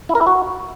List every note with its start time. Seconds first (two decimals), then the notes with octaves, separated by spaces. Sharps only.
0.09 E4
0.15 A#4
0.21 E4
0.27 F#4